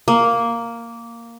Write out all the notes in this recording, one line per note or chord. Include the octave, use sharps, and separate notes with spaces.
A#3